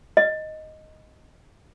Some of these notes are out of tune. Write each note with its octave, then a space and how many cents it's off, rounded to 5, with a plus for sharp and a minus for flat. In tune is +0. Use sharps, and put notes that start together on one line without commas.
D#5 +5